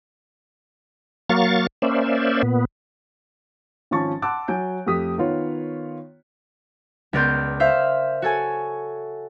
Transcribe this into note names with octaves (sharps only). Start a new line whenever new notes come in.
F#3 A#3 F5 C#6 A6
A#3 C#4 C5 D5 E5
A#2 B3
G#1 F3 C#4 A5 C#6 A6
F#5 A5 C6 D6 E6 F#6
F#3 G#5 G6 D7
F2 A3 G4 D#6 B6
D#3 B3 F4 C#5
C#2 B3 A#4 D5 C6 G6
C5 E5 F5
F#4 A4 C#5 G#5